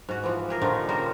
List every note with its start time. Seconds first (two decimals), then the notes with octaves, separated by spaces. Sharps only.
0.09 G#2 F#4
0.24 E3 F3
0.49 G4 G#4 A#4
0.62 A#2 D3 D#3 F3
0.89 C#3 G3 A#4 C5